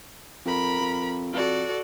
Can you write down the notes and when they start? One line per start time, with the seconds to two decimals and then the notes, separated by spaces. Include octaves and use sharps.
0.45 F2 A#4 B5
0.80 F2
1.33 F2 F#4 A4 D5